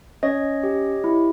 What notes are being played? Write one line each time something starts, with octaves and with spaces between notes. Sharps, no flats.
C#4 C#5 D#5
G4
E4